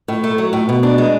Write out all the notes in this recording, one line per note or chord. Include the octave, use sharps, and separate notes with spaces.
A2
A3
F#3
A2
B2
D4
G#3